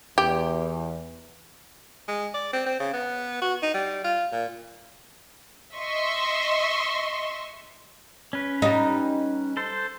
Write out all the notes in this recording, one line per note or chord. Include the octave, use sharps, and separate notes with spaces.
E2 G4
G#3
D5
C4
C4
C#3
B3
F#4
D#4
G3
F4
A#2
D#5 E5 C6 C#6
C#4 B4
G3 D#4
A4 C5